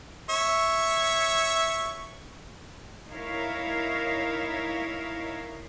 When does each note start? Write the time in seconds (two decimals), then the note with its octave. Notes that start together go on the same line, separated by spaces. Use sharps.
0.29 C#5 E5
3.10 D#4 E4 A#4 C#5 E5 F5